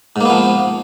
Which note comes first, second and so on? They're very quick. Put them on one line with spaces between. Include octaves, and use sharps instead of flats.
G#2 A#3 B3 F3